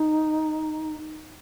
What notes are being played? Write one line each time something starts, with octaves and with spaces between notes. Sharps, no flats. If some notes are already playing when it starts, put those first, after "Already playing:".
Already playing: D#4